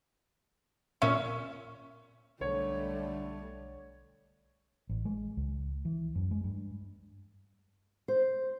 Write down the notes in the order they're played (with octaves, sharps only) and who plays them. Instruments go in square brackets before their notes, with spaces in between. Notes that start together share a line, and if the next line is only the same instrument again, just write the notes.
[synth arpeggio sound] A#2 E5 [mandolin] C#4
[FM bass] B1 [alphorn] D3 [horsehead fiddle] G3 A3 [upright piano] C#5
[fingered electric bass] A1
G#3
C#2
E3
F#2
G#3
G2
[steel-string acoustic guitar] C5